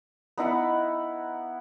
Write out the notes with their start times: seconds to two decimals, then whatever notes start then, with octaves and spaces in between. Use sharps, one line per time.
0.38 B3 D#4 E4 F#5